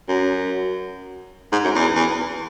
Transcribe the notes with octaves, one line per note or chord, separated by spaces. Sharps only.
F#2
G#2
F#2
E2
E2